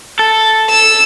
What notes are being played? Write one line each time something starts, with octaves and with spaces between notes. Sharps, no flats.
A4
E6